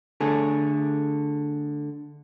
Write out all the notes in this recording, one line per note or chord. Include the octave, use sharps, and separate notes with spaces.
D3 A3 G#4